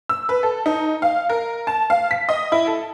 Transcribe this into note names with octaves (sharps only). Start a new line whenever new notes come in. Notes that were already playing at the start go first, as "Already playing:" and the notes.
E6
B4
A4
D#4
F5
A#4
A5
F5
B6
D#5
E4
A4